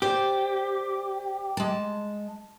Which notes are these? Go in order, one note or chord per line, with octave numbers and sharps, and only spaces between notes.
G4 C5 D5
G#3 A5